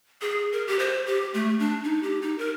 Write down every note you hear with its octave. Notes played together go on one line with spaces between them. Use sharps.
G#4
A#4
G4
C5
G4
A3
D4
D#4
G4
D#4
A#4